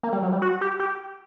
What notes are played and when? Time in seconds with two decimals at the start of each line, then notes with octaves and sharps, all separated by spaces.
0.03 A#3
0.13 G3
0.23 F#3
0.32 G3
0.42 F#4
0.61 G4
0.80 G4